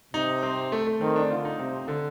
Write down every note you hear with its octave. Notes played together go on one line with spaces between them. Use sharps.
C3 D#4
C4
A3
A3
D#3 C4
D4
D3 F4
D#4
C3 C4
D3